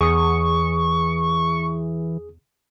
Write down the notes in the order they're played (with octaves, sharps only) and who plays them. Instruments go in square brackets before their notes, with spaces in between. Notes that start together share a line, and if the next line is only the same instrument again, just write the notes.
[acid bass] E2 [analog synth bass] E3 [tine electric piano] G#4 D#6 [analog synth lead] C#6